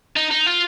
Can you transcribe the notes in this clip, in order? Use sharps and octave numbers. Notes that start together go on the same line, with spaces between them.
D#4
D#4
F4